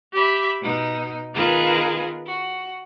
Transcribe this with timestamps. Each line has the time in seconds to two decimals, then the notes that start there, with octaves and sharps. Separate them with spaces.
0.13 G4 E5 B5
0.61 B2 D#4
1.35 D#3 B3 F4 G#4 A#4 B4
2.26 F#4